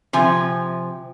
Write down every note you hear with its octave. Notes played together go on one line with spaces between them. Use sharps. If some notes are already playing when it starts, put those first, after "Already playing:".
C3 F3 G#5